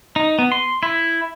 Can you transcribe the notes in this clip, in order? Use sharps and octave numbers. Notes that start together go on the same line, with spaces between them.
D#4
B3
C6
E4